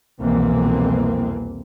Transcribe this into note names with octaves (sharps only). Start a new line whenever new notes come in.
C2 F2 B2 E3 A#3 C4